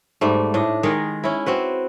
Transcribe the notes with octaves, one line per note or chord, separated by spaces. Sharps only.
G#2 G3 A3
A2 D4 D#5
D#3 G#3 G#4 A#4
C#4 E4
C4 F#4 B4